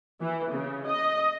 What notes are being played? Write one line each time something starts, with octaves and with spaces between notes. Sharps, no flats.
E3
C#3
D#5